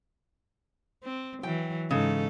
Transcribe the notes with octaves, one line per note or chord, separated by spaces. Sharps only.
C4
E3 F#3 G5
G#2 C#3 D#4 A4